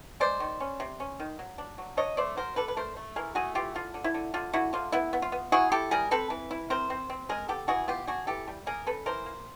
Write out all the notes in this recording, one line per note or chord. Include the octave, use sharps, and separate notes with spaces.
G#3 C5 D5
D#3
C#4
C3
C#4
D#3
F#3
D4
F#3
D4 C#5 D#5
A3 C5 D5
F#3 A#4 C5
D4 A4 B4
B4
A3 A#4 C5
A3
E3 G#4 A#4
A3 F#4 G#4
E3 F4 G4
D3 F4
D3
E4
D3
D3 F4
D3 E4 F#4
D3 F4
B3 E4
B3
F4
B3
E4 F#4 G#4
E4 G4 A4
G3 G#4 A#4
C4 A4 B4
E3
E4
C4 A#4 C5
C4
C4
G#3 G#4 A#4
B3 G4 A4
E3 F#4 G#4
B3 F4 G4
D4 F#4 G#4
E3 G4 A4
G3
A#3 G#4 A#4
C#3 A4 B4
E3 A#4 C5
A#3